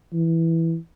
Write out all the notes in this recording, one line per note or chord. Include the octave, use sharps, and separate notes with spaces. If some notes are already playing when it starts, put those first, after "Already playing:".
E3